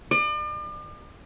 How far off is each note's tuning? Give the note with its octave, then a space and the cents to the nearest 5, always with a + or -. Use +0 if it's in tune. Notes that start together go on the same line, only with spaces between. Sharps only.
D5 +40